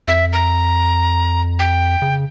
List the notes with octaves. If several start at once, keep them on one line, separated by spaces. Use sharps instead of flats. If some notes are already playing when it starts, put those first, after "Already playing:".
F2 E5
A#5
G5
C#3